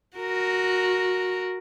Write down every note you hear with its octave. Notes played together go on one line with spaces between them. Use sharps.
F#4 A#4